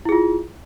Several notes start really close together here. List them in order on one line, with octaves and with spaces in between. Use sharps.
E4 G#4 F4